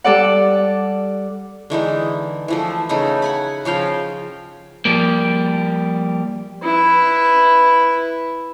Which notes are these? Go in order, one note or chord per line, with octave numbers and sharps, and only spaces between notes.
G3 A4 D5 F#5
D3 E3 G#3 D#4
E3 F3 A3
C#3 A3 D#4
F#5 G#5 B5
C#3 F3 F5 G5
F3 G3 A#3
E4 B4